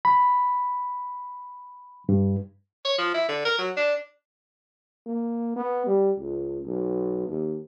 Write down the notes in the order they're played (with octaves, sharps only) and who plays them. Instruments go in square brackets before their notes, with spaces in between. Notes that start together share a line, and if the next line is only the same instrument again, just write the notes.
[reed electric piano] B5
G2
[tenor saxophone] C#5
F3
E4
D3
A#4
F#3
D4
[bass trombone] A#3
B3
G3
C#2
B1
D#2